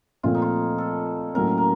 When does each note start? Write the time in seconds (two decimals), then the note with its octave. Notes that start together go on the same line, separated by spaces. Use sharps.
0.23 A#2 F3 A3 C4 F4
0.35 D#4
0.42 F4
0.78 A4
1.34 A2 F#3 A#3 C#4 A#4
1.58 A#4